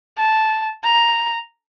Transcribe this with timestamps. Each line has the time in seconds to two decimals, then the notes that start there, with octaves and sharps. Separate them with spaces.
0.18 A5
0.84 A#5